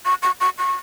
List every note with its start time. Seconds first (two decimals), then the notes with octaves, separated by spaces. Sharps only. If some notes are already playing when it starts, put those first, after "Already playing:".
0.05 C#6
0.23 C#6
0.41 C#6
0.58 C#6